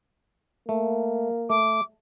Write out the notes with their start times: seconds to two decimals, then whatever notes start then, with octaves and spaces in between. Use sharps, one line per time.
0.69 A3 A#3
1.50 A3 D6